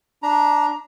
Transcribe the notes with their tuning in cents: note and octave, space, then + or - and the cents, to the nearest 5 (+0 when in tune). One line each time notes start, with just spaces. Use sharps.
D4 +0 A#5 +15